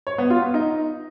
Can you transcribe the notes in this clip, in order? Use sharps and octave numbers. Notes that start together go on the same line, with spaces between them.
C#5
B3
F4
B3
D#4